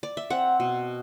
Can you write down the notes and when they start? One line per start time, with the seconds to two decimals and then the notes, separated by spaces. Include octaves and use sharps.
0.03 D5
0.17 E5
0.30 C4 F#5
0.60 B2